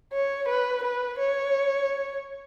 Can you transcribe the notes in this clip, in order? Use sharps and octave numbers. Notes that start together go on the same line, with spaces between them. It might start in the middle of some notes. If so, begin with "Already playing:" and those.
C#5
B4
B4
C#5